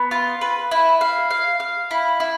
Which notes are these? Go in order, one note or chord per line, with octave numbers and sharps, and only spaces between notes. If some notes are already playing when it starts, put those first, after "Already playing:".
Already playing: B3
F4
B4
E4
F5
F5
F5
E4
E4